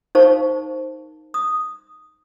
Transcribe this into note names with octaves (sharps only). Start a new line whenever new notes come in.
D#4 A#4 C5 F5 A5 C#6
D#6